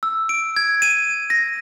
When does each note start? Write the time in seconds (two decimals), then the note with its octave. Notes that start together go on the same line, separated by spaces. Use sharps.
0.03 E6
0.29 D7
0.56 G#6
0.82 D#7
1.30 A#6